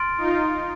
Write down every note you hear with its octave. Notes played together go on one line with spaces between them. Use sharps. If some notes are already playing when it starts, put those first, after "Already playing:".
Already playing: C6 F6 A6 D7
D#4 F4